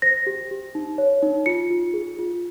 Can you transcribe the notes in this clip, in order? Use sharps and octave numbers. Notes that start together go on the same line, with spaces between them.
C5 A#6
G4
G4
D#4
C#5
D#4
F4 C#7
F4
G#4
F4